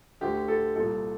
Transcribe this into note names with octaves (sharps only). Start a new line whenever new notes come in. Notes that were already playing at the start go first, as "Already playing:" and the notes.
D2 D3 G4
A4
C2 A#2 A4